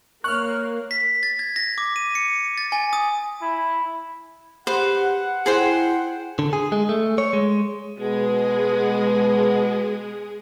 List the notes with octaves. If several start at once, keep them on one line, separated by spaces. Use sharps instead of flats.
A#3 C#5 C#6 F6 F#6
B6
A6
G#6
A#6
D6
D#7
C#7
A6
G#5
D#6
E4
G4 B4 C5 F#5
E4 G#4 C5 G5
D3
G#4
G#3
A3
C#5
G#3
B2 G#3 G#4